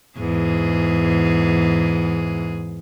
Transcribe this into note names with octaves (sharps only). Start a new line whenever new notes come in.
E2 G#2 G#4